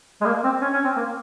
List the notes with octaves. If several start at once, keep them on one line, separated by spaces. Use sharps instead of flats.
G#3
A#3
C4
C#4
C#4
C4
A#3